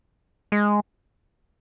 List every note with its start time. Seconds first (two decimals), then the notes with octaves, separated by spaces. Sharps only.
0.52 G#3